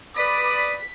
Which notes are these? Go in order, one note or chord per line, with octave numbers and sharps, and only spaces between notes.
B4 D5 B5 D#6 B6